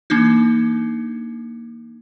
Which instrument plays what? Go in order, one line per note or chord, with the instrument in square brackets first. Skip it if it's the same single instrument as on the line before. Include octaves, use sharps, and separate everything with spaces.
[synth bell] E3 A#3 D4 D#4